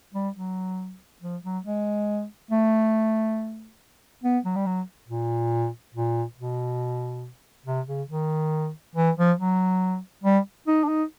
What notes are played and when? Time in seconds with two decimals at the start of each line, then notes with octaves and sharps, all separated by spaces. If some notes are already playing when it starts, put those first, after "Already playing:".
0.14 G3
0.36 F#3
1.22 F3
1.43 F#3
1.64 G#3
2.51 A3
4.23 B3
4.45 F#3
4.56 G3
4.66 F#3
5.08 A#2
5.94 A#2
6.38 B2
7.66 C3
7.88 C#3
8.10 D#3
8.95 E3
9.17 F3
9.38 F#3
10.24 G3
10.67 D#4
10.84 D4
10.88 D#4